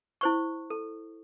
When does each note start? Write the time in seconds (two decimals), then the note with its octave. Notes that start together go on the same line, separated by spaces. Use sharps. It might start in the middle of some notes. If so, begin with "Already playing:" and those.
0.21 E4 C5 C#6
0.70 A4